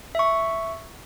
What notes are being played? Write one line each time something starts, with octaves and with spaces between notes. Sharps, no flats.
E5 C#6